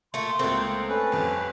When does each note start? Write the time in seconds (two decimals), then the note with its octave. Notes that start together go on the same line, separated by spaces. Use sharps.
0.14 A#2 A3 C6
0.39 C#2 A3 A#3 C4
0.89 C#4 A4 B4
1.12 G1 F2